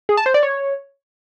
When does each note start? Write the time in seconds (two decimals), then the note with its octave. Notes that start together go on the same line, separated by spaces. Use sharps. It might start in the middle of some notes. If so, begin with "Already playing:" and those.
0.09 G#4
0.17 A5
0.26 C5
0.34 D5
0.43 C#5